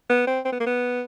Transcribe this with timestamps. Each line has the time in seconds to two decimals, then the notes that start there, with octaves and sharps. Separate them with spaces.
0.09 B3
0.27 C4
0.45 C4
0.52 B3
0.60 A#3
0.66 B3